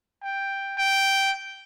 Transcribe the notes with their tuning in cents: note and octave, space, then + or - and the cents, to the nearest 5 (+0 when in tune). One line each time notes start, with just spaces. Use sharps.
G5 +5
G5 -5